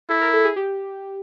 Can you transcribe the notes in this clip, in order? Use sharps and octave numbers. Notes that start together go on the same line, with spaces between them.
E4 A4
A#4
A4
G#4
G4